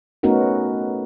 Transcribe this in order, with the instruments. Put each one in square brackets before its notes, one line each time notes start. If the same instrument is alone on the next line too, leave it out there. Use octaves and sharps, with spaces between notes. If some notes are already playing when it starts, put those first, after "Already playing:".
[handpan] A3 B3 C#4 D#4 F#4 A#4